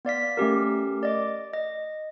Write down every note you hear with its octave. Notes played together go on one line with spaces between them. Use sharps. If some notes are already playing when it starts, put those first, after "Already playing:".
B3 D5 F5 B6
A3 C#4 G4 A#4
D5 D#5 D6
D#5